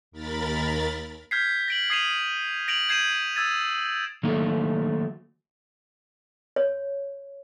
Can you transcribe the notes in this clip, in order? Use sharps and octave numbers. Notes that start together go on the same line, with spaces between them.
D#2 A#4 B5 A6
F6 G6 G#6 B6 C7
A#6 D7 F#7
D#6 G#6 C7 D7 D#7 F7
A#6 D7 F7 F#7
G6 G#6 C7 D#7 E7
D#6 E6 G#6 A6 D#7
D#3 F#3 A3 A#3
C#5